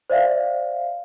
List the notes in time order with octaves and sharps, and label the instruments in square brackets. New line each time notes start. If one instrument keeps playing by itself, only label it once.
[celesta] C5 D5 E5 F5